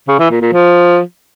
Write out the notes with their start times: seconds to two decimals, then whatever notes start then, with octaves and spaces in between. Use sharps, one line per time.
0.08 C#3
0.19 E3
0.30 A#2
0.42 A#2
0.53 F3